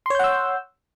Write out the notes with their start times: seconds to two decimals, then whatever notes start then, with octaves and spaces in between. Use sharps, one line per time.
0.06 C6
0.10 C#5
0.15 G6
0.19 F#5
0.24 E6